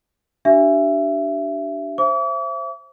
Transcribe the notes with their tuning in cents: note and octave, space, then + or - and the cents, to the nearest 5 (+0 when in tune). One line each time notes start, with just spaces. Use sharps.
D4 +0 G4 -35 E5 +20
C5 +15 E5 +25 D6 -45